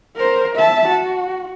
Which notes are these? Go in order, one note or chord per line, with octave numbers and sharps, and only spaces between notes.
A#4 C5
E5 A5
F#4